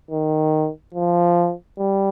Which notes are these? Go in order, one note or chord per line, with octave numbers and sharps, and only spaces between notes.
D#3
F3
G3